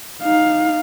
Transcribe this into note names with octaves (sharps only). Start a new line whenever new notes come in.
D#4 F5